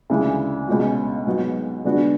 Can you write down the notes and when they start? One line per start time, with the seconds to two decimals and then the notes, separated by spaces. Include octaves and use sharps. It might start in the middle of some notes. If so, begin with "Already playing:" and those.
0.10 D2 C#3 E3 G#3
0.68 C#2 B2 G#3 C#4 F#4
1.26 G#2 F#3 B3 F#4
1.84 D3 G#3 B3 D4 F#4